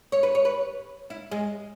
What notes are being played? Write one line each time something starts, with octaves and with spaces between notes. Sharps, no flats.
C#5
B4
C#5
B4
E4
G#3